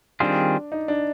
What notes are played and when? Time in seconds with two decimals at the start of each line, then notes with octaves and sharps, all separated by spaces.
0.20 D#3 G3 C4 D4 F4 G#4
0.72 D#4
0.88 D4